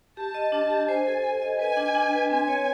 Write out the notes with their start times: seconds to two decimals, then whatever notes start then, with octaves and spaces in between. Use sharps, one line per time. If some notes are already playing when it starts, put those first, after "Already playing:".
0.17 G4 A5
0.34 D#5
0.52 D4
0.70 G4
0.88 C5 G#5
1.07 A4
1.24 A4
1.42 D#5
1.59 B4 G#5
1.77 D4
1.95 D4
2.13 B4
2.30 C4 G#5
2.48 C#5